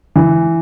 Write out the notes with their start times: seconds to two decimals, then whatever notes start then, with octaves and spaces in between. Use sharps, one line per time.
0.16 E3